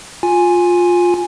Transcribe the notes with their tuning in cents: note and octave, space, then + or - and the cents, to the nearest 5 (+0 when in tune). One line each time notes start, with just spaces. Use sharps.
F4 +15 G#5 +0